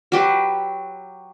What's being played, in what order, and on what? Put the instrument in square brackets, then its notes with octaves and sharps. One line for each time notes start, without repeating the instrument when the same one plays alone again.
[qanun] F#3 G4 B4